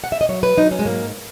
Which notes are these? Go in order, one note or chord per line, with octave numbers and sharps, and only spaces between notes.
F#5
E5
D#5
F#3 C#5
B4
F#3 D#4
C#4
G#3
G#2 A#3